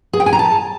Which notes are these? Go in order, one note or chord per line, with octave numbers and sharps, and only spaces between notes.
G#4
G5
G#5
A#5
A5